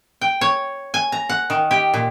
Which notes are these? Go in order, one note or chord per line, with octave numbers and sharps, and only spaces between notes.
G5
C#5
G#5
A#5
F#5
D#3
G4
A#2